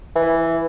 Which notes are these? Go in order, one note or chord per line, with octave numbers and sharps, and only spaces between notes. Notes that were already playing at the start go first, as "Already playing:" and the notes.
E3